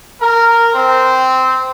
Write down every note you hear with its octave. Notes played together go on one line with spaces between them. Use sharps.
A#4
C4